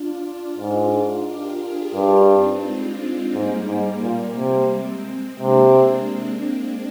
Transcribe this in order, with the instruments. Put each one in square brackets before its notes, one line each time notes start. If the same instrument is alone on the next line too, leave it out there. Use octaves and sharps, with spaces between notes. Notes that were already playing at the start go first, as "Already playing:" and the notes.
Already playing: [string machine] D4 F4
[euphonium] G#2
[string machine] G4 A#4
F4 G#4
[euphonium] G2 [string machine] D4 F4
[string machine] C4 D#4
G#3
[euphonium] G#2 [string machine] G3 A#3
[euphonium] G#2
A#2
C3
[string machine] G#3 C4
[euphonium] C3 [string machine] A#3 D4